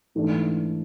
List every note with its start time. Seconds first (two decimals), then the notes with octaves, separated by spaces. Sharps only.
0.15 G#2 E3 A3 D4